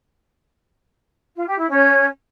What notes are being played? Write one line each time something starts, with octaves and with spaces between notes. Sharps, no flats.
F4
G4
E4
C#4